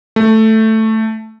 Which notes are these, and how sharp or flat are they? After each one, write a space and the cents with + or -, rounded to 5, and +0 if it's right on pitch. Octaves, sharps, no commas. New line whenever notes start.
A3 +5